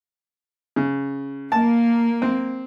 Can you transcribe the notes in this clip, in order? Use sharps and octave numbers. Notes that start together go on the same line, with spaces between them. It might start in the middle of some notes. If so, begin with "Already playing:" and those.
C#3
A#3 A5
C4